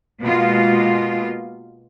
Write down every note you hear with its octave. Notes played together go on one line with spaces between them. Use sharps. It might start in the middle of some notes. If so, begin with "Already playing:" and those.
B2 G#3 A#3 F4